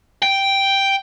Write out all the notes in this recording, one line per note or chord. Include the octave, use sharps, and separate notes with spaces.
G5